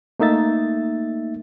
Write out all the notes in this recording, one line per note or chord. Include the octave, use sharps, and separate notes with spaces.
A3 A#3 D#4 E5 A6